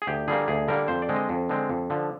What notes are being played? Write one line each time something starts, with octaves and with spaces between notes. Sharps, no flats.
G#4
D2 G4
D3 G3 A#3 G#4
D2 G#4
D3 G3 A#3 A#4
F2 C5
D5
D3 G#3 C4
D#5
F2
D3 G#3 C4
F2
D3 F3